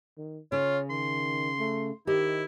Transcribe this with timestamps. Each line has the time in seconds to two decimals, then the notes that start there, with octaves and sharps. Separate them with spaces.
0.17 D#3
0.52 C#3 F4 C#5
0.90 D#3 C6
1.59 A3
2.07 D#3 E4 G4 C5 D#5